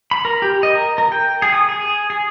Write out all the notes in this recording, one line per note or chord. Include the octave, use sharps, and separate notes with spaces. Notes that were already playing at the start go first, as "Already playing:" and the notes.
B5
A#4
G4
D#5
A#4
A#4
G5
G#4
D#6
G#4
G#4